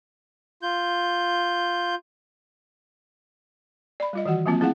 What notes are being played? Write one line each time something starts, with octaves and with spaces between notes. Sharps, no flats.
F4 G6
D5 B5
G3 F4 D#5
D#3 E3 F#4 F#5
F3 F#3 A#3 C4 F4
A3 C4 E4 G#4 F5 F#5